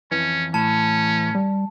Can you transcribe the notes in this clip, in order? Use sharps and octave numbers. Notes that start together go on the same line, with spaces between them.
F2 E3 C#4
A2 C#4 A5
G3